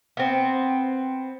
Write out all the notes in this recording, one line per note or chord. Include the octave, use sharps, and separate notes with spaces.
B3 C4